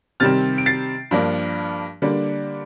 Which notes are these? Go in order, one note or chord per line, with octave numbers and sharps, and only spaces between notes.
C3 D#3 G3 C4 F6 A6
D7
A6 C7
G2 F3 A#3 D4
D3 G3 A#3 D4